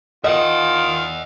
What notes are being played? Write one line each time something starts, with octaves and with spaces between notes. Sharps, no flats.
D#3 F4 D#5 E5 F#5